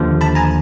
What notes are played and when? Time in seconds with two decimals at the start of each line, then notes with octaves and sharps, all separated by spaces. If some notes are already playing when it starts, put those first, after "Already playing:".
Already playing: D#2 D3 F3
0.21 A5 B5
0.35 G#5 A#5